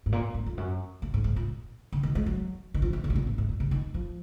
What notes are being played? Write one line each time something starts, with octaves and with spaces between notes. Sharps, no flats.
G#2
A#2
G#2
F2
F#2
A#2
G#2
G#2
A#2
C#3
D#3
G#3
F#3
D#3
F3
D#3
C#3
C3
A#2
G#2
G#2
A#2
C3
D#3
F3